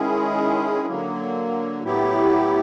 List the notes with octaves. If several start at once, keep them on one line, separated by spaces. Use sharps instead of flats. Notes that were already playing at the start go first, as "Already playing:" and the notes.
Already playing: D#3 G#3 C#4 E4 G#4
D3 F#3 A#3
A2 F#3 B3 E4 G4